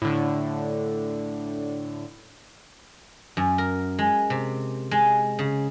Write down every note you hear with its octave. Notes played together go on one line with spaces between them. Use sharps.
A2 D3
F#2
A#4
G#3
C3
G#3
C#3